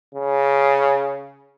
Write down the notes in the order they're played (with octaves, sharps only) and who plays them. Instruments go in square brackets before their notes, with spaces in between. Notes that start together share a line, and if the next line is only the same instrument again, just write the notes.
[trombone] C#3